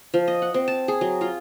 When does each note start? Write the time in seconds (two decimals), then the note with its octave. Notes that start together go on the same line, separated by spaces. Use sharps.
0.14 F3
0.28 D#5
0.42 F#5
0.54 C4
0.68 A5
0.88 G#4
1.01 F#3
1.21 F4